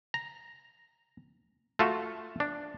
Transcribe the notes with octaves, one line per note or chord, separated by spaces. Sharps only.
A#5
A3 F4 F#4 A4
D4